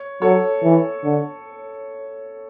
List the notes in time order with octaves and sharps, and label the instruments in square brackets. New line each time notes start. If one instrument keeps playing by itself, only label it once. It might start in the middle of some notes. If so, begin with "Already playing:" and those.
Already playing: [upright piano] C#5
[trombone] F#3 [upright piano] A4 C#5
[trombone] E3
D3